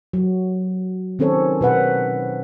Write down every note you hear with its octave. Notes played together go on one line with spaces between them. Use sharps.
F#3
D#3 C4 C#4 A4 C#5
B2 B4 F#5